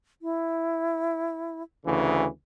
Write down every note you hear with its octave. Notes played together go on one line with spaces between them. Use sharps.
E4
D2 C#3 E3